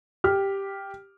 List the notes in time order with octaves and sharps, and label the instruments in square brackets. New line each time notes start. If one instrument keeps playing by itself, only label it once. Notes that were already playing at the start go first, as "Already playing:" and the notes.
[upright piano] G4 F6